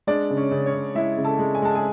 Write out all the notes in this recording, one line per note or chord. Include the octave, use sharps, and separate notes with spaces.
G#3 D4 D5
C#3
C#4 C#5
C#3
C#4 C#5
C#3
G#3 E4 E5
C#3
A4 A5
G#3
G#5
G#3 A5
G#4 G#5